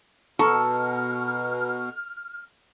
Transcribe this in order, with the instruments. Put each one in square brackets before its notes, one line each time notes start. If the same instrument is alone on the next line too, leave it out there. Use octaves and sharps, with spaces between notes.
[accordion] B2 [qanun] A4 [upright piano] A#5 C#6 [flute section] F6